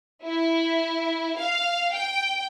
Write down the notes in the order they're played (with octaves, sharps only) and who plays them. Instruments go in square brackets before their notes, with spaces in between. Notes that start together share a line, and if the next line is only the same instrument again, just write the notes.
[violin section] E4
F5
G5